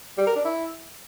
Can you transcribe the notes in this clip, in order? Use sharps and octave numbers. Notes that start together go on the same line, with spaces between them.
G3
A#4
D4
E4